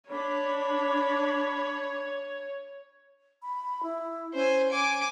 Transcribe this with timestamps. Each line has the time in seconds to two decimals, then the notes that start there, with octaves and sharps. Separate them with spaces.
0.10 D4 C#5 B5
3.42 B5
3.83 E4
4.34 C#4 C5 G#5
4.70 G#5 D6